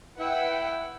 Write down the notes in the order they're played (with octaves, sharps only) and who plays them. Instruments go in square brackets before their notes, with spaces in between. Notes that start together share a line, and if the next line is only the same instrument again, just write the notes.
[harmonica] E4 [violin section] B4 F#5 G5